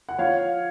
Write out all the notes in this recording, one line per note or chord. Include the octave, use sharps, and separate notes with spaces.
F#5
F3 C#5 F5